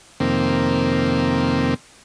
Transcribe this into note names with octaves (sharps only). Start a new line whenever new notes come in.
F2 C3 D#3 A#3 C4